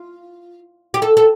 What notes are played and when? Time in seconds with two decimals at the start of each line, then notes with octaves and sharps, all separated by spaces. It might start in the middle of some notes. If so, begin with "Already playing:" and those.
Already playing: F4
0.94 G4
1.02 A4
1.17 A4